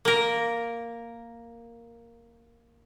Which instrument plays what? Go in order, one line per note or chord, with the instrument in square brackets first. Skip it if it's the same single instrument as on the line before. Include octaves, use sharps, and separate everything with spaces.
[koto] A#3 A#4